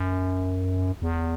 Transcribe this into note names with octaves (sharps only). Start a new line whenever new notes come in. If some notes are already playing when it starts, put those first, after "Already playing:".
Already playing: F#2
E2